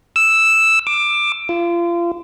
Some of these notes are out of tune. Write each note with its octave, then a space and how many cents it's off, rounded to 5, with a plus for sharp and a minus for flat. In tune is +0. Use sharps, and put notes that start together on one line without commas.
E6 +0
D6 +15
F4 -30